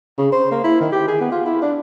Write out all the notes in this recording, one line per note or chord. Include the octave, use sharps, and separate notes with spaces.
C#3
C5
A#3
E4
D#3
G4
G#4
B3
F4
E4
D4